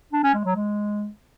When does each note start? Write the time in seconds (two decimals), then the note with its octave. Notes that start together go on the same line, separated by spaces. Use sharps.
0.13 D4
0.23 C#4
0.34 G#3
0.45 F#3
0.55 G#3